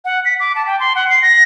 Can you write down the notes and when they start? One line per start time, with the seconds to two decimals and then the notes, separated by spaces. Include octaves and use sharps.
0.05 F#5
0.25 B6
0.40 D6
0.55 A5
0.67 G5
0.80 C6
0.96 F#5
1.09 C7
1.22 A#6